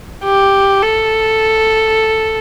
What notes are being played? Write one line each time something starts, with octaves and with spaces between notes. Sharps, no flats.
G4
A4